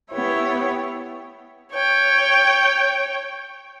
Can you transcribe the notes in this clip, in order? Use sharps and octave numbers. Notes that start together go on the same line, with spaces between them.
B3 E4 G4 C#5
C#5 G5